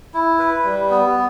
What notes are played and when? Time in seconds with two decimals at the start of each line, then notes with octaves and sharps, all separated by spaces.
0.14 E4
0.39 B4
0.64 G3
0.90 B3